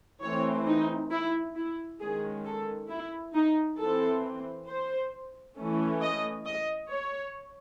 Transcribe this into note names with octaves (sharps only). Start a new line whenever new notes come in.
E3 A3 C4 C#5
D#4
E4
E4
D#3 G#3 C#4 G#4
A4
E4
D#4
E3 C4 A4
C5
E3 A3 C#4
D#5
D#5
C#5